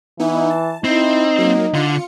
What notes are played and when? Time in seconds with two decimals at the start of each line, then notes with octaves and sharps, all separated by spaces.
0.19 E3 B3 D#4 E4
0.50 A5
0.84 C4 D#4 E4
1.38 F#3 A#3
1.74 D3 F4 C#7